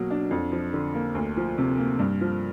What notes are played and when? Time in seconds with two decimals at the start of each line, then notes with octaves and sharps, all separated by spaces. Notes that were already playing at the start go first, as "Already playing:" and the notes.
Already playing: B2 F#3 A#3
0.10 D4
0.31 F2
0.52 F3
0.73 D3
0.94 A#3
1.15 D2
1.37 F3
1.58 C3
1.78 A#3
1.99 G2
2.21 F3